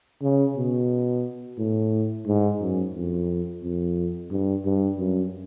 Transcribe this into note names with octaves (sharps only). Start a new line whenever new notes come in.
C#3
B2
A2
G#2
F#2
F2
F2
G2
G2
F#2